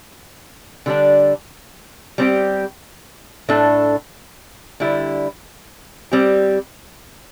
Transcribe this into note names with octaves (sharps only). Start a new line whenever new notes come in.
D3 G3 D4
G3 C4 G4
A2 A3 D4 A4
D3 G3 E4
G3 C4 G4